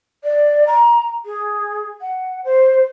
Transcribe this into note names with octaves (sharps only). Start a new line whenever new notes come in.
D5
A#5
G#4
F#5
C5